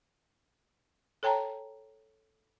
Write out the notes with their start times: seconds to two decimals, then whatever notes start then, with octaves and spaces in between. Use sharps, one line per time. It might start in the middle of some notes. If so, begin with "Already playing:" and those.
1.23 A4 C#5 G5 A5 A#5